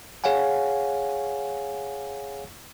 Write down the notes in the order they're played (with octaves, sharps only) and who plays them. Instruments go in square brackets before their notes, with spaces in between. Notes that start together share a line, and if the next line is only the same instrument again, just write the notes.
[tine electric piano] G#4 C#5 F5 F#5 G#5